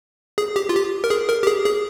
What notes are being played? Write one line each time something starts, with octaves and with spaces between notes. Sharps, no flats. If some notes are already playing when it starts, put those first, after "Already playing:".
G#4
G4
F4
G4
A#4
G#4
A#4
G4
G#4
G#4